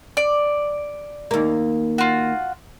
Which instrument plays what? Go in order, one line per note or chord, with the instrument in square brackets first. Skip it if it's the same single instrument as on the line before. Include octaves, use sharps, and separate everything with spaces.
[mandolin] D5
[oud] D#2 A#3
[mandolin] F4 F#4